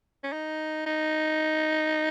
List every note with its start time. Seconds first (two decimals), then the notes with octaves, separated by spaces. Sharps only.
0.24 C#4
0.33 D#4
0.86 D#4